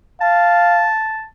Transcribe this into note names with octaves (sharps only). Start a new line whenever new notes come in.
F5 A5